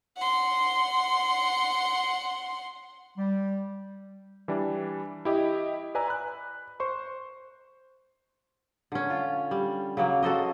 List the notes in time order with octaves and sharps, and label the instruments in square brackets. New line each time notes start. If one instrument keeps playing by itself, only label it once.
[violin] F#5 C6
[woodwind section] G3
[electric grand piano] E3 G3 D4
E4 G4 D#5
B4 D5 G#5 A#5 E6
B5 F#6
C5 C6 C#6
[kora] D3 C#4
F4
G3
C#3 F#3 A#3
F#4 A4 C5 D#5